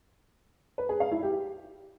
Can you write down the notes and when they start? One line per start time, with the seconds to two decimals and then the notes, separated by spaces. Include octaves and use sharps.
0.78 B4
0.89 G#4
1.00 F5
1.11 E4
1.23 G4